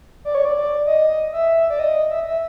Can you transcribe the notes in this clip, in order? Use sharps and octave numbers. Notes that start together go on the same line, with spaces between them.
D5
C#5
D5
D5
D#5
E5
D5
D#5
E5
E5